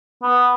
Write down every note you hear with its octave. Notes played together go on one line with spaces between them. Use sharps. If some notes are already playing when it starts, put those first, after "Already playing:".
B3